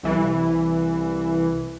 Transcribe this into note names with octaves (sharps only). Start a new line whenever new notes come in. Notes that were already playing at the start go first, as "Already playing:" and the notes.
C2 E3